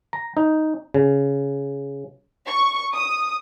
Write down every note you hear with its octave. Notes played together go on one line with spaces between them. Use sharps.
A#5
D#4
C#3
C#6
D#6